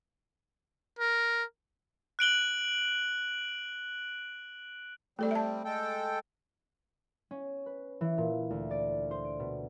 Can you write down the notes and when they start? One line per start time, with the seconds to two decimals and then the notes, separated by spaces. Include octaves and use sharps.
0.99 A#4
2.19 F#6 D7 F#7 G7
5.19 G3 A3 C4 A4 D5
5.31 E5 A5
5.65 G#3 A4 G5
7.31 C#4
7.66 B4
8.01 E3
8.18 A#2
8.51 D2
8.71 D5
9.11 C5
9.24 D7
9.40 B2